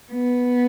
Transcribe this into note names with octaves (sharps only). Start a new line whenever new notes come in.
B3